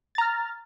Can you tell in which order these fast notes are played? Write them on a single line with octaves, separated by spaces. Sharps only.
A6 A#5 F6